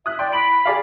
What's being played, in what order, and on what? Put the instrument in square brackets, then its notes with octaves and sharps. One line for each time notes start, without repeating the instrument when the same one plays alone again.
[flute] E5 [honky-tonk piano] D#6 F#6
[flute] D5 [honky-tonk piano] G5 C6
[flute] B5 [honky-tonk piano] D7 F#7
[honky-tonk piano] G#4 D5 F5